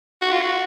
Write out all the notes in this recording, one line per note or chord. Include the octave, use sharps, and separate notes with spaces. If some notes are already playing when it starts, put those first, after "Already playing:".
F#4
F4
F#4